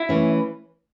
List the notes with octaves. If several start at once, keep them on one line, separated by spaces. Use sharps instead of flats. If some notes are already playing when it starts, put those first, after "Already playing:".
Already playing: E4
E3 A3 C#4